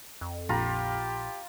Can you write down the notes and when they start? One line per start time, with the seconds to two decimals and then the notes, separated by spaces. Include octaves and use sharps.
0.21 F2
0.49 A#1 F4 G4 A#5 B5